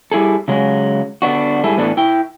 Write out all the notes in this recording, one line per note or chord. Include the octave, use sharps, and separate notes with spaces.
G3 E4 G#4 A4
C#3 F#3 G#3
D3 B3 D4 F#4
G#2 G3 E4 G#4 A4
A2 E3 B3 D4 A4
E4 G5